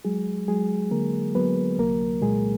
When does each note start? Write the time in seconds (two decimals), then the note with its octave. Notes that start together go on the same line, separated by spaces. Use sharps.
0.05 F#3 G#3 G#4
0.48 F#3 G#3 G#4
0.91 D3 A#3 A#4
1.35 F#3 B3 B4
1.79 C2 A#3 A#4
2.22 A#2 G#3 G#4